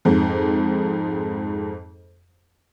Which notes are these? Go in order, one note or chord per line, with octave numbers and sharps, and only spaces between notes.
F2 G#2